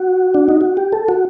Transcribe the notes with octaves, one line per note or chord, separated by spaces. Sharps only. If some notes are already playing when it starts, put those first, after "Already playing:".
Already playing: F#4
D4
D#4
F#4
G4
A4
F#4